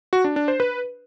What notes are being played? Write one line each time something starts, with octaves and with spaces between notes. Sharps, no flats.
F#4
D4
D4
C5
B4